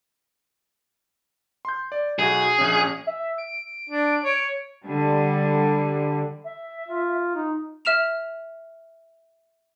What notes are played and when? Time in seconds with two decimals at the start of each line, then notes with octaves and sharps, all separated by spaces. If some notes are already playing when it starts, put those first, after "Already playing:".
1.65 C6 G6
1.92 D5
2.19 B1 F#4 G#4
2.58 A#1 C#4
3.07 E5
3.38 D7
3.90 D4
4.24 C#5
4.83 D3 G3
6.45 E5
6.88 F4
7.35 D#4
7.85 E5 F6 E7 F7